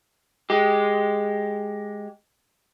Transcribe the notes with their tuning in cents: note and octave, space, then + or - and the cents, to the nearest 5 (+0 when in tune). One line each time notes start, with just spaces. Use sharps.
G#3 +0 G4 +0